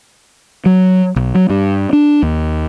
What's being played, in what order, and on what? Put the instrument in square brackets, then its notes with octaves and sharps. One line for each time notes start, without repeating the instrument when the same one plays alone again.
[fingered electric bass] F#3
B1
F#3
G2
D4
D#2